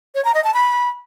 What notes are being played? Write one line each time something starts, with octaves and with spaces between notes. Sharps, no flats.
C#5
A#5
D#5
A5
B5